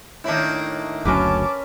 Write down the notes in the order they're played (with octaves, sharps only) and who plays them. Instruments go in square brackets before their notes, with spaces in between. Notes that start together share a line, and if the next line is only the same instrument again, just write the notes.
[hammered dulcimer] A2 D4 [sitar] D#3 A#3 E4
[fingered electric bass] F#1 D2 F#3 [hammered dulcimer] C#4 A#4 B4 [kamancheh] A5 D6